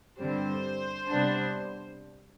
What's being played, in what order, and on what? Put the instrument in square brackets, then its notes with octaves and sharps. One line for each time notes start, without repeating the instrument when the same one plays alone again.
[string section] G2 D3 G3 C4 C5
C3 G3 B3 D4